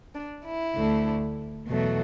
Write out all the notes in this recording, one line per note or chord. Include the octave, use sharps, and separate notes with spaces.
D4
E4
D2 D3 A3
E2 B2 F#3 A3